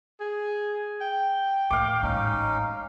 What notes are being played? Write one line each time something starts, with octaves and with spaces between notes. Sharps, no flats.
G#4
G5
A2 D#3 F5 D6
A1 G#2 C#4 D#4